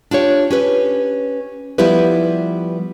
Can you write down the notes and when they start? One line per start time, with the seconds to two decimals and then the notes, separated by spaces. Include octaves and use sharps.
0.11 D4 F4 G4 C#5
0.51 C#4 G4 B4
1.78 F3 G3 B3 E4 G4 B4